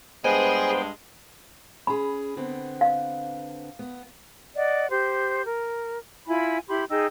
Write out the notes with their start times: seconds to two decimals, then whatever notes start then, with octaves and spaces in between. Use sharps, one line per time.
0.25 G2 G#3 B3 G#4 C5 G5 G#5 C6
1.87 C#4 G#4 B5
2.37 D3 B3 C4
2.81 F5
3.79 B3
4.56 D5 D#5 F#5
4.90 G4 C5 G6
5.45 A#4
6.28 E4 F4 G#5 B5
6.68 E4 G4 B5 C6
6.90 D#4 G#4 G5 E6